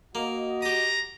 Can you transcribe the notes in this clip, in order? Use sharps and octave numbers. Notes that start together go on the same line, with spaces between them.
A#3 F#4 D#5
G4 A#5 D#6